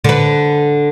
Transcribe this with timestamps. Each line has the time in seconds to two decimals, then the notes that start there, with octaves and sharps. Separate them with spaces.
0.04 D3 B4